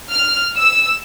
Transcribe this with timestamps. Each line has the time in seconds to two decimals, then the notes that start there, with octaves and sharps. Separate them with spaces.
0.11 F6
0.57 E6